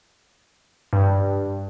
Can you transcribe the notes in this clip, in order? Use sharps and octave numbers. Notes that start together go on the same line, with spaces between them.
G2